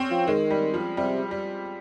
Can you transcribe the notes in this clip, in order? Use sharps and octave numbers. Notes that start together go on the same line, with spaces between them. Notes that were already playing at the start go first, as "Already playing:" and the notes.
Already playing: C4 C#4
F3
D#3 G#3
G3
F3
C3 G3
G3